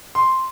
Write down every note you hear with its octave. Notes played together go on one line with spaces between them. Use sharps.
C6